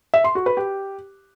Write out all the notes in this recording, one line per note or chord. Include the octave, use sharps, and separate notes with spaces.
E5
C6
F#4
B4
G4